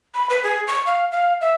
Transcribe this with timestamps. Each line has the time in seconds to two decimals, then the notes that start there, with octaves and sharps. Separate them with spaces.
0.14 B5
0.30 B4
0.44 G#4
0.67 C#6
0.86 F5
1.12 F5
1.41 E5